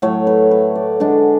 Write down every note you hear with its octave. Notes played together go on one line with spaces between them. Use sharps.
A2 F#3 A3 C#5
B4
B4
D5
D3 G#3 D4